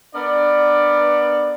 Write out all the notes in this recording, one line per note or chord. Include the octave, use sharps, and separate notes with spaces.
B3 D4 A#4 D5